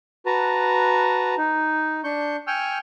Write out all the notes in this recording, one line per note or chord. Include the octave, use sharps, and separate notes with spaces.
F#4 B4 A5 A#5
D#4
D4 C#6 G6
G5 G#5 C#6 E6 F6 G6